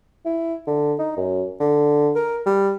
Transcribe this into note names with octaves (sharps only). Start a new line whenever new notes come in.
E4
D3
D#4
F#2
D3
A#4
G3